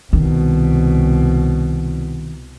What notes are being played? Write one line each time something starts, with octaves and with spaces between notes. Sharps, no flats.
C2 B2 D#3